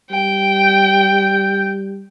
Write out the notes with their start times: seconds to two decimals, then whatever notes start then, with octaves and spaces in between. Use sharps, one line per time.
0.11 G3 G5
0.62 G6